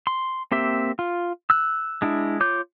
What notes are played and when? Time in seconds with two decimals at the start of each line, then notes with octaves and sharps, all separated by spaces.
0.07 C6
0.52 A#3 C4 G4 E5
0.99 F4
1.50 E6 F#6
2.02 G#3 D4 E4
2.40 F4 C#5 D6 G6